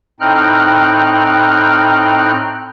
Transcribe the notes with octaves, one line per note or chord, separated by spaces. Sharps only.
A2 C4 D#4 G5 F6 F#6